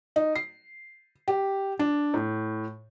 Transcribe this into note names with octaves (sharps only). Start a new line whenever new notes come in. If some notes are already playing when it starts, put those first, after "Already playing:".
D#4
C7
G4
D4
A2